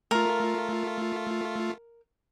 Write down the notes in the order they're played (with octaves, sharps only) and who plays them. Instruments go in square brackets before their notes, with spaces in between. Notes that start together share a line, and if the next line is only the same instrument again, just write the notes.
[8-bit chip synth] A3 F4 [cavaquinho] A#4